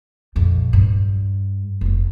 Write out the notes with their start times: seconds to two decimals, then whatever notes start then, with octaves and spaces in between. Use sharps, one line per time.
0.36 A#1 F2
0.73 G2
1.81 F1 A#3